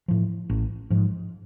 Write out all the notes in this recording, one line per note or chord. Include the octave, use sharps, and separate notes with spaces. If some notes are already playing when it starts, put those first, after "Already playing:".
A2 F3
A1
G#2 F3